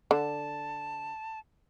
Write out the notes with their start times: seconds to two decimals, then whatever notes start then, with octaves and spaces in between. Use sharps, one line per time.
0.11 D3 A5